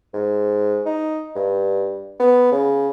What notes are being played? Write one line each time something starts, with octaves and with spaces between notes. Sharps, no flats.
G#2
D#4
G2
B3
C#3